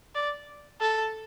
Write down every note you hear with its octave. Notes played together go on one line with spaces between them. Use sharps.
D5
A4